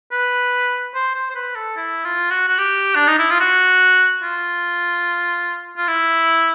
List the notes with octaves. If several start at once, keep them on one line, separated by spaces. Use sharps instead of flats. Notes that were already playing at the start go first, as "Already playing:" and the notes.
B4
C5
C5
C5
B4
A4
E4
F4
F#4
F#4
G4
D4
D#4
E4
F4
F#4
F4
F4
E4